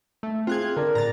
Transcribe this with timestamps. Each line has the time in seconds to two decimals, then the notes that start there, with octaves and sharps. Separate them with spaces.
0.23 A3
0.47 C4 F4 G#4 F#6 G#6
0.77 D3 A#4 D5
0.95 A2 A#5 A6